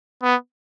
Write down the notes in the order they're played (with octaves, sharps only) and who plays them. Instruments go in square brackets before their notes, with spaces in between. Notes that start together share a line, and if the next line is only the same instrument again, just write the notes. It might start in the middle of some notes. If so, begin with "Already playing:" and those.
[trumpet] B3